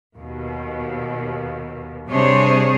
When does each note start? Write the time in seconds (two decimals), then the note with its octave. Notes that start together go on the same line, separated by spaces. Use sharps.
0.15 D#2 B2
2.08 C3 G3 D4 G#4 C5 C#5